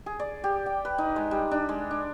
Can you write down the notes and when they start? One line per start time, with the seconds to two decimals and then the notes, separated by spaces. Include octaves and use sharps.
0.06 G#4
0.20 D5
0.44 G4
0.66 G5
0.85 B4
0.98 D#4
1.16 G#3
1.31 G3
1.51 D4
1.69 G#3
1.91 D4